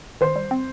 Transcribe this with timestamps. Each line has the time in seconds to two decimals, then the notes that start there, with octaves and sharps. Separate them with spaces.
0.21 D#3 C5
0.36 G3
0.51 C4